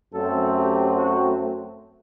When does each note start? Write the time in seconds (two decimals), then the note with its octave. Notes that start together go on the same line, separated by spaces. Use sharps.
0.13 F#2 F#3 A3 C4 A4
0.53 G4
0.95 F#4